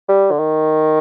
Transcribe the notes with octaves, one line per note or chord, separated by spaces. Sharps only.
G3
D3
D#3